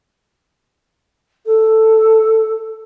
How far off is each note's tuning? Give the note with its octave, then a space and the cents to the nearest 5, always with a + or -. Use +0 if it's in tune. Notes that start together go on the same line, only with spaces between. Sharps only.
A4 +5